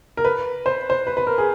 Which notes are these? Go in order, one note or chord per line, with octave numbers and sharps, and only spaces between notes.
A#4
B4
C5
C5
B4
B4
A#4
G#4